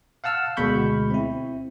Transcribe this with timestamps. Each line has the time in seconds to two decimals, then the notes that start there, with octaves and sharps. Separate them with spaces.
0.24 F5 F#5 A5 E6 F6
0.57 D2 B2 G#3 B5 C#6 G6
1.10 C4 E4